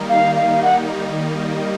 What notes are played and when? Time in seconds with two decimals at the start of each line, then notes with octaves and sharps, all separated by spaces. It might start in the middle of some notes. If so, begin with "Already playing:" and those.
Already playing: D#3 G3 A#3 D#4
0.09 F5
0.36 F5
0.62 F#5